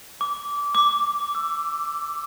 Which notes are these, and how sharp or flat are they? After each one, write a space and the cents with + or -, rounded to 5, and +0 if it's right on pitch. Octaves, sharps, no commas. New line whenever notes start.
D6 -20
D6 +0
E6 +15